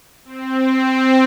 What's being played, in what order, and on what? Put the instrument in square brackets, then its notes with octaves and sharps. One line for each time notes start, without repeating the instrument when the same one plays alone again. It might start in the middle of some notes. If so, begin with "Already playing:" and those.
[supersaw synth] C4